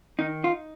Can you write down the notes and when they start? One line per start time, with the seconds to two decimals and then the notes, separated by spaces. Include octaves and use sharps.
0.19 D#3 D#4
0.44 D#4 F4